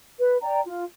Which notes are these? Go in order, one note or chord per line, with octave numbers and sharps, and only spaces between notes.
B4
D5 G5 A#5
F4